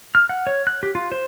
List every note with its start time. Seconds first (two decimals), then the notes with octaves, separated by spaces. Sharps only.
0.15 F6
0.29 F#5
0.47 C#5
0.67 F#6
0.83 G4
0.95 F4
1.12 C5